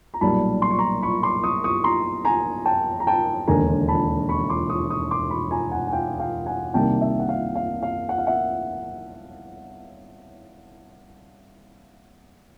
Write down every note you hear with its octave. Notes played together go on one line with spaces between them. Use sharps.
A#5
B1 A#2 G3 A5 B5
C6
C#6
A#5 C6
B5 C#6
C6 D6
C#6 D#6
C#6 D#6
A#5 C6
G#5 A#5
G5 A5
A#5
G5 A5
E1 D#2 D3 G#5 A#5
A5 B5
B5 C#6
C6 D6
C#6 D#6
C#6 D#6
C6 D6
B5 C#6
G#5 A#5
F#5 G#5
G#5
F5 G5
F5 G5
F#5 G#5
C2 C3 D#3 G3 A#3 G5 A5
E5
F#5
F5
F5
F5
F#5
F5
E5 F#5